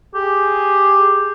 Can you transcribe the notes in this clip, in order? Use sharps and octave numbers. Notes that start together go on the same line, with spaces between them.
G4 G#4